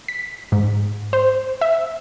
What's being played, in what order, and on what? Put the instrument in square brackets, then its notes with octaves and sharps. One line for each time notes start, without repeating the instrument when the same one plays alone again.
[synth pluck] B6
G#2
C5
E5